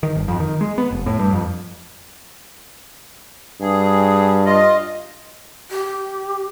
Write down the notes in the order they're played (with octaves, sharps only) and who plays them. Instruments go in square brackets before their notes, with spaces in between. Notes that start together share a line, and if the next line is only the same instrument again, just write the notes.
[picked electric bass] D#3
G1
F2
D#3
G#3
B3
F1
A2
G2
F2
[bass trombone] G2 [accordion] G#4
[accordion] F4 D#5
[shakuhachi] G4